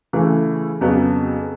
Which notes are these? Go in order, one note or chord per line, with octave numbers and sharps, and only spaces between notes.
C#3 E3 A3
F2 C#3 F#3 B3